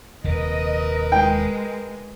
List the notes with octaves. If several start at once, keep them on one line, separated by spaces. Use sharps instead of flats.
D#1 C3 A#4 B4 D#5
G#3 G5